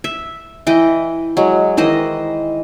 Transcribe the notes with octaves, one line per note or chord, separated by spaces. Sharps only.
E5
E3 D#5 G5
F#3 G#3
D#3 E3 C5 D#5